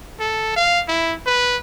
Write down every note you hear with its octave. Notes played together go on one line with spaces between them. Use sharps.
A4
F5
E4
B4